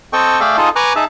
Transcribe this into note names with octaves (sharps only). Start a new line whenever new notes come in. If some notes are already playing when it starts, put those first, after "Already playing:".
C4 A4 D#5 G5 C#6
A3 G#4 D5 E5 F5 G5
D#4 F4 G#4 A4 D#5
B4 G#5 A#5 C#6 D6 F#6
D#4 G#4 E5 A5